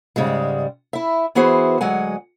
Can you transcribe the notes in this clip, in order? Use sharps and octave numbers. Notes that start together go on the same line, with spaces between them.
G#2 C#3 G3 G#3
E4 E5
E3 B3 E4 F#4 G#4 C5
D2 F#3 G#3 F#5 G#5